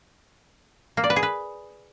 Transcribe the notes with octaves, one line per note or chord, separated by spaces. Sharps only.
A#3
D5
B4
G#4
B4